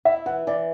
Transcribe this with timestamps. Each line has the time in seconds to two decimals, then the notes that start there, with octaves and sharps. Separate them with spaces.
0.05 E4 E5
0.26 E3 F#5
0.47 E3 D5